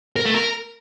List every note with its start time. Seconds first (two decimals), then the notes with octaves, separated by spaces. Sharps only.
0.16 A#4
0.25 A3
0.34 A#4